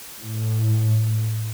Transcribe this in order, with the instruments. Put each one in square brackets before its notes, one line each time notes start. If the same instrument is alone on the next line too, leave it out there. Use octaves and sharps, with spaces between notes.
[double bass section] A2